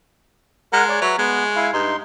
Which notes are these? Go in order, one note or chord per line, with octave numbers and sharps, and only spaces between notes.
G#3 A#4 F#5 A#5
C#5 D5
F#3 B4 E5
G#3 B3
E4 F5
G2 D#4 C6